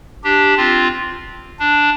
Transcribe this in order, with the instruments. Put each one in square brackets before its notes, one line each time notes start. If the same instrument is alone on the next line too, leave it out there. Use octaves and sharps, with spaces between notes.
[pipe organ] D4 G4
C4 F4
D4